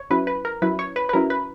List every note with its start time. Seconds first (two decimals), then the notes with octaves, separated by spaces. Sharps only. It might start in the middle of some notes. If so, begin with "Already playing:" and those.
Already playing: C#5
0.10 F#3 C#4 E4 B4
0.27 B4
0.45 A#4
0.62 F#3 C#4 E4 B4
0.79 C#5
0.96 B4
1.09 B4
1.13 F#3 C#4 E4 A#4
1.30 B4